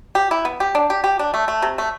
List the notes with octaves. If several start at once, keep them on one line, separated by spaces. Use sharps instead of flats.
G4
E4
B3
G4
D4
G4
G4
D4
A3
A3
C3
A3